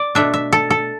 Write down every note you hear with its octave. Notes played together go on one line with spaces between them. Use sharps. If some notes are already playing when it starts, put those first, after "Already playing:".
Already playing: D5
B2 A3 D4 E5
E5
A4
A4